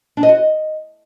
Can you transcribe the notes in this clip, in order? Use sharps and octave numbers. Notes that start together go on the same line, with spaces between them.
D4
D#5
F#4
D#5